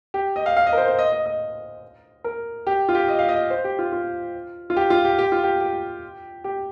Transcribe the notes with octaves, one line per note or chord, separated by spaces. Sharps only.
G4
D#5
F5
F5
D#5
A#4
C5
C5
D#5
D#5
D#5
A#4
G4
F4
G4
D#5
F5
D#5
C5
G4
F4
F4
F4
G4
F4
G4
G4
F4
G4
G4
G4